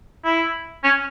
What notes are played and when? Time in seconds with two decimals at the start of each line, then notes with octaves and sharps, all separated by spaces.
0.25 E4
0.84 C#4